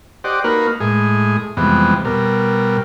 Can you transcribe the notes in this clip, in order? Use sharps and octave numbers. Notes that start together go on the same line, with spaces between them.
G4 C5 D5 D#5 F#5
A#3 D#4 F#4 A#4 B4
A2 G#3 G#4
F2 C3 E3 G3 G#3 B3
B2 G3 A#4